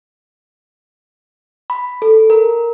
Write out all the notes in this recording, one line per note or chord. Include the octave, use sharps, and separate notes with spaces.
B5
A4
A#4